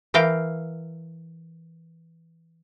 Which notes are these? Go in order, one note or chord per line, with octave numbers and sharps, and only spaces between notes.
E3 A#4 F5 G5